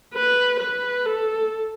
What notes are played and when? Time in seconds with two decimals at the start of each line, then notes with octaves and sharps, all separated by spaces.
0.14 B4
0.60 B4
1.06 A4